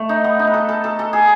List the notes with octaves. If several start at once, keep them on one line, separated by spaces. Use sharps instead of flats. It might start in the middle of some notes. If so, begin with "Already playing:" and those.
Already playing: A3
D#4
B3
D#4
B4
A4
A4
A4
A4
G#4